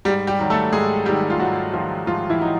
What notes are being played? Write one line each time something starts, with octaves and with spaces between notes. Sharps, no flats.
G#2 G3 G4
G3 G4
D#3 F#3
A3 A4
G#2 G#3 G#4
D#3 F#3 G3 G4
F4
G#2 F#3 F#4
D#3 F3 F#3 F4
G#2 F3 F4
E3 E4
F#3 D#4